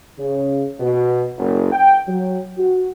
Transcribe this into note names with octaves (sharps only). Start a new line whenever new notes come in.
C#3
B2
F#1
G5
F#3
F#4